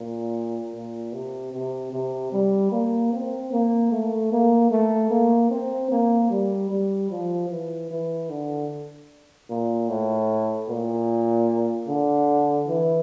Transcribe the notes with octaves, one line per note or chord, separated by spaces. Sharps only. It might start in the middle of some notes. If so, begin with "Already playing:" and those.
Already playing: A#2
A#2
C3
C3
C3
G3
A#3
C4
A#3
A3
A#3
A3
A#3
C4
A#3
G3
G3
F3
E3
E3
D3
A#2
A2
A#2
D3
E3